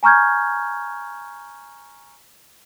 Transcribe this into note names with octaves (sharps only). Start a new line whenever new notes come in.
G#5 A#5 C#6 F6 G6 G#6